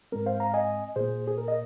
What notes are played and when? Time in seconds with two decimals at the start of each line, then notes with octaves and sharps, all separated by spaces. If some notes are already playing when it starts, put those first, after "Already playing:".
0.12 G#2 G#3 C4 A#4
0.26 C5 F5
0.40 F5 A#5
0.54 D#5 G#5
0.96 A#2 A#3 G#4 C5
1.27 G#4
1.38 A#4
1.48 D#5